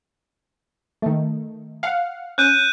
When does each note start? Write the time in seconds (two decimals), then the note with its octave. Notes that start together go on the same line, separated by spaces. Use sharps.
1.02 D#3 A3
1.83 F5 F#5
2.38 C#4 F#6 G6 D#7